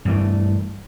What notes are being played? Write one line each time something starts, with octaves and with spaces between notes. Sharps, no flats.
G2 E3 A3